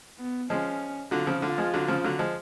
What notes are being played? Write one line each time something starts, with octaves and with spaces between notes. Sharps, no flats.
B3
F3 G#3 C#4
D3 F#3 F4
C#3 F3
D3 F4
F3 G#3
D3 F#3
C#3 F3
D3 F#3
F3 G#3